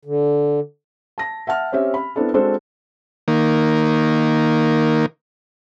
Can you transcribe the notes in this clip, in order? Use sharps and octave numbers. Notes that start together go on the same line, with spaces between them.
D3
A5 A#6
E5 F#5 A5 F6
C4 C#4 G4 E5
B5
B3 C4 D4 E4 A4
G#3 C4 D4 F#4 A4 C5
D#3 A#3